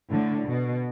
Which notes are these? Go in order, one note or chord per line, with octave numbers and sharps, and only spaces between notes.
A2 D3
B2